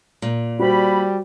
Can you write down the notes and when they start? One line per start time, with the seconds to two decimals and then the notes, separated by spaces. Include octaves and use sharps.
0.22 A#2
0.60 G3 F#4 C5 B5